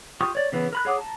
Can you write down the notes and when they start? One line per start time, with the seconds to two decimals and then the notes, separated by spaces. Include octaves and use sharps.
0.21 F4 G4 C#6 D#6
0.35 C#5 D5
0.52 C#3 E3 B3
0.73 A#4 B5 F#6
0.85 G#4 C#5 F#5 D6 D#6
0.98 A5 A#5